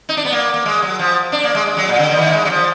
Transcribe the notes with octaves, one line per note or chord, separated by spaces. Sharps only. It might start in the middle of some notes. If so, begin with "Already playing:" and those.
D#4
D4
B3
A#3
A#3
G#3
F#3
F3
D4
A#3
G#3
G#3
F#3
A#2
D3
F3
D#3
A#3
G#3
F#3
F3